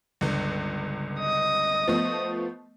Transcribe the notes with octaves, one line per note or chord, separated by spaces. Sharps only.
G1 C#2
D#5 D#6
F3 A3 B3